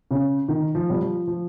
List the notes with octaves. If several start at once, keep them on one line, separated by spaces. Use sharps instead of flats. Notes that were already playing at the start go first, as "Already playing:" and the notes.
C#3
D#3
F3
G3
F3
F3